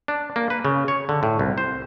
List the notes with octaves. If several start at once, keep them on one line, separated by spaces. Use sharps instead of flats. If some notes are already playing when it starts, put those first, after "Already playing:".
D4
A#3
B4
C#3
C#5
D3
A2
C2
C5